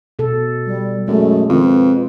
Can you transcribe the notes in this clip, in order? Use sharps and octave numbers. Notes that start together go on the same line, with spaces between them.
B2 A4
G3
F#2 G#3 A3
F2 D#3
B4